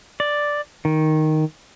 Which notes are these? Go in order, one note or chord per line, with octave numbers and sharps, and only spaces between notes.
D5
D#3